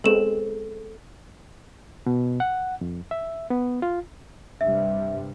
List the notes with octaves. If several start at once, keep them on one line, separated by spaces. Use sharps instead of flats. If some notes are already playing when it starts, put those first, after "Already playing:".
G#3 B3 C4 A4 E7
B2
F#5
F2
E5
B3
F4
G2 C3 G3 E5